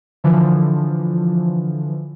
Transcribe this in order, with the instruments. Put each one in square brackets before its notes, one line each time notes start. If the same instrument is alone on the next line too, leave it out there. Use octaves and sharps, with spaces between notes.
[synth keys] D3 E3 F3